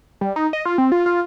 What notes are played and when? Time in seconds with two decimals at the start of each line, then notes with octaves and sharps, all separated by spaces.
0.21 G3
0.36 D#4
0.53 D#5
0.65 F4
0.78 C4
0.92 F4
1.06 F4